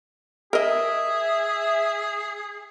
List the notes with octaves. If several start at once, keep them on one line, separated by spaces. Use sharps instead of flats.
G#4 A#4 D#5 E5